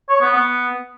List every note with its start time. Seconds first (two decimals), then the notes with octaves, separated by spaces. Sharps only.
0.09 C#5
0.21 B3
0.33 B3